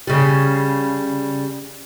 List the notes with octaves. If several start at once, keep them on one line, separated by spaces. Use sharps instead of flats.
C#3 G3